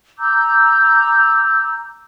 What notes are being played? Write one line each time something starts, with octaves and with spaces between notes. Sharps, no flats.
A#5 D6 E6 G6